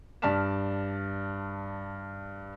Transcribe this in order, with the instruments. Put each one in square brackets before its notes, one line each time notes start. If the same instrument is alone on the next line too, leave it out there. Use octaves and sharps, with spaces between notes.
[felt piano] G2 D5 A5 F6 B6 E7